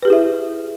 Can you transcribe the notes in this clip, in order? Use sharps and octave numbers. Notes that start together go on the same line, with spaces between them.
E4 G4 G#4 B4 E5